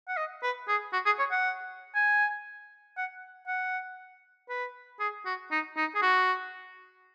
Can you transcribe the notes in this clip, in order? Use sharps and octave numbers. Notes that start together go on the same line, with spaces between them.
F#5
D#5
B4
G#4
F#4
G#4
C#5
F#5
G#5
F#5
F#5
B4
G#4
F#4
D#4
D#4
G#4
F#4